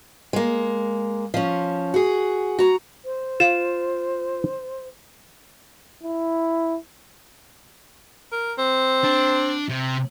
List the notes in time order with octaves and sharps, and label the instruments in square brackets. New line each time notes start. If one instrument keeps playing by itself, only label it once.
[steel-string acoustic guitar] G#3 A#3
F3 C#4
F#4 G#4
F#4 A#5
[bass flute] C5
[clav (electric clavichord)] F4 [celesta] E7
[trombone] E4
[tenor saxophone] A#4
C4
[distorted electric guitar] D4
C3